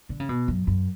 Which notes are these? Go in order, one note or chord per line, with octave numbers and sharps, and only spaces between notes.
D3
C#3
B2
F#2
F#2